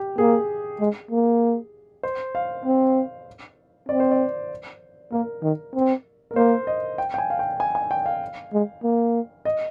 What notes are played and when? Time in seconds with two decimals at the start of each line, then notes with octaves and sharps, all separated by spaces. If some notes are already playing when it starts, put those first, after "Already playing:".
Already playing: G4
0.18 A#3 G#4
0.80 G#3
1.11 A#3
2.03 C5
2.35 F5
2.65 C4
3.89 C4 D5
4.00 C5
4.11 D5
5.12 A#3 A#4
5.43 D#3
5.75 C4
6.31 A#4
6.36 A#3 C5
6.67 D#5
6.98 G5
7.14 G5
7.18 G#5
7.30 F5
7.39 G5
7.60 G#5
7.75 G#5
7.91 G5
8.06 F5
8.53 G#3
8.83 A#3
9.45 D#5